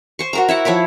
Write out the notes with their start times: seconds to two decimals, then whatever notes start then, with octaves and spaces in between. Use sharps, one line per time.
0.19 C5 C#6
0.33 F#4 A#4 A#5
0.48 E4 E5 F#5
0.65 F3 E4 C#5 B5